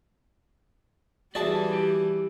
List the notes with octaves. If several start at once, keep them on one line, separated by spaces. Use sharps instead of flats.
E3 G3 F#4 G#4 D5 E5 A5
G4